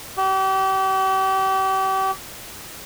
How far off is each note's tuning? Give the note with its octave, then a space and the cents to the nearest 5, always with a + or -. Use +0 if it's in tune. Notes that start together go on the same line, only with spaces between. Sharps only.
G4 -40